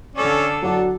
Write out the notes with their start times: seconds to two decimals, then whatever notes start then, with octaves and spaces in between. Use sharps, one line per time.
0.15 D3 C#4 A4 D5
0.62 F#3 D4 F#4